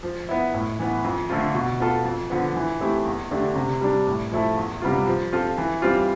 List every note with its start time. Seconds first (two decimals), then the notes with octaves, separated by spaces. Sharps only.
0.03 F3
0.29 B3 E4
0.54 A2
0.79 E3 B3
1.04 F2
1.30 D3 A3 C4 F4
1.54 B2
1.80 B3 F4 A4
2.05 F2
2.30 D3 F3 B3
2.56 E3
2.81 A3 C4 E4 G4
3.05 E2
3.31 D3 A3 D4 G4
3.56 C3
3.81 G3 D4
4.07 A2
4.32 F3 A3 E4 A4
4.56 E2
4.82 C3 G3 B3 F4
5.07 F3
5.33 C4 F4 A4
5.58 E3
5.82 G3 C4 F4